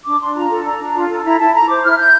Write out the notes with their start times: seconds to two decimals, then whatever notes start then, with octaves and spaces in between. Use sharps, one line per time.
0.06 D4 D6
0.20 D4 C6
0.35 F4 A#5
0.50 A4
0.65 D4 A#5
0.80 D4
0.95 F4
1.10 A4
1.24 E4 A#5
1.39 E4 A5
1.54 A4 A#5
1.69 C5 D6
1.84 E4 F6
1.98 E4 G6